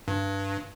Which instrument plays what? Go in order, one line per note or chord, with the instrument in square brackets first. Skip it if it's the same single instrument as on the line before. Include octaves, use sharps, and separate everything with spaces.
[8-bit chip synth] G2